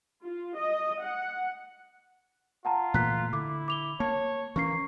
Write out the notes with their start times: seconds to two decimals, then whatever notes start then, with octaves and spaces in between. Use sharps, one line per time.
0.24 F4
0.58 D#5
1.04 F#5
2.65 F4 F#5 A5 A#5
2.94 A#2 E3 A3 A#5 F#6 B6
3.33 D3 E4 D6
3.68 D6 F7 G7
4.00 A#3 C#5 A5
4.56 E3 A#3 C#4 C#6 C7